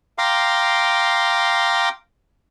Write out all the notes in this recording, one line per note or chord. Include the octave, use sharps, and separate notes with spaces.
F5 G5 A#5 C6 D6